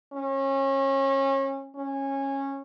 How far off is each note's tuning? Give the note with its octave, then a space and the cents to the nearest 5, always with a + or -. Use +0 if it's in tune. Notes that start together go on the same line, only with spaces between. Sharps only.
C#4 -30
C#4 -15